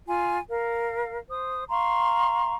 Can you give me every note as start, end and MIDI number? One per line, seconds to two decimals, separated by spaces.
0.07 0.37 65
0.07 0.37 80
0.48 1.18 70
0.48 1.18 77
1.28 1.63 72
1.28 1.63 87
1.69 2.54 77
1.69 2.54 82
1.69 2.54 84
1.69 2.54 85